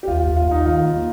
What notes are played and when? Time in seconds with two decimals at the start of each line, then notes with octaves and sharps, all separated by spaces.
0.03 G4
0.07 D#2 F4
0.27 D#2
0.37 F4
0.46 D#2
0.51 D#4
0.65 D#3 F4
0.86 A#3